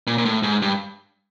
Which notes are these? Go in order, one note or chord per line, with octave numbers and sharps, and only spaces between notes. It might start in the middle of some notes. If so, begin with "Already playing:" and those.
A#2
A#2
A2
G#2
G2